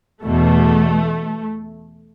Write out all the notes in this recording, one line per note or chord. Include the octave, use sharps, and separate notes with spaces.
E2 B2 A3